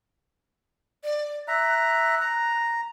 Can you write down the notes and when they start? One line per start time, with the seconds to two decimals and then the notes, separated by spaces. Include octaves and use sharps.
1.03 D5
1.48 E5 A#5 F#6
2.21 A#5